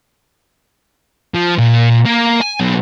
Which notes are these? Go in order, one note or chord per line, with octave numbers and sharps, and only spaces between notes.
F3
A#2
A#3
G#5
B2 F#3